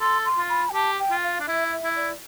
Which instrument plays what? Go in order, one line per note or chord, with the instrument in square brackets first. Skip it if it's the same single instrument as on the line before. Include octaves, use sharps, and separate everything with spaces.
[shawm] A4 [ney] C6
[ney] C6
[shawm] F4
[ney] B5
G5
[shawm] G4 [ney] A5
[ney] G5
[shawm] F4
[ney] F5
[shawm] D4
[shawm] E4 [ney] E5
[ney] E5
[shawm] E4
[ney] D5